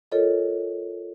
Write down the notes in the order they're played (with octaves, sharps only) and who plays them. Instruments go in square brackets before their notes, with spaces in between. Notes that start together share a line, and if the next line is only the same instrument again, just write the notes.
[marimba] F4 A4 A#4 C#5 D#5